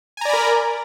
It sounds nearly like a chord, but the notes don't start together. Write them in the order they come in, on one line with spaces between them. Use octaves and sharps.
G#5 A#5 D5 B5 A#4